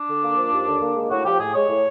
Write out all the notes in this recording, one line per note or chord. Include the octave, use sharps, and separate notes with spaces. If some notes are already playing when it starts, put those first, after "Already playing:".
Already playing: D4
D3
A#3
F3
D#2
D3
A#3
G#3
A2 F#4
F3 G4
A2 G#4
G#3 C#5
A2